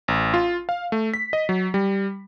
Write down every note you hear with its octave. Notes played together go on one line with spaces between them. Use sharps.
A1
F4
F5
A3
B6
D#5
F#3
G3